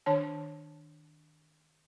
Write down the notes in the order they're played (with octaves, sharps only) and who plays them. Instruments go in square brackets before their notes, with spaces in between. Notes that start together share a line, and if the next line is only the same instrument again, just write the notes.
[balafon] D#3 D4 C#5 A5